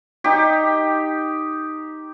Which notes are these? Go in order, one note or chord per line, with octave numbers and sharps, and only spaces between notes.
D#4 G4